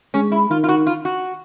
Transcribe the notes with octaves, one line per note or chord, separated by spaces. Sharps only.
G#3 C#4
E4
D#3 F4
F4
F#4
F4
F#4